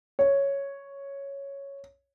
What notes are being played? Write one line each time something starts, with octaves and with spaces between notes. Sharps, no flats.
C#5